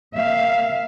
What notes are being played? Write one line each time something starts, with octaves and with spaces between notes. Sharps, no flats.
A#3 E5 F5